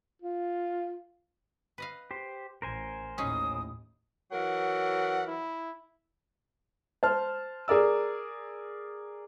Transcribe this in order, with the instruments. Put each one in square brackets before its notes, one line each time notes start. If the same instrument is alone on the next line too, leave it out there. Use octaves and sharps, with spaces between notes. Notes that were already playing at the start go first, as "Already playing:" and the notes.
[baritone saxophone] F4
[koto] B4 D#5 F5
[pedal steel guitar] G4 C5
[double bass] A1 [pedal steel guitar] A#4 C5 G#5
[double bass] D#2 A2 [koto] C#4 D#4 G#4 [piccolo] D#6
[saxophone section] E3 F#3 A#4 [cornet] F#5
[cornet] E4
[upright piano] C5 A5 F6
G#4 A#4 D5 E6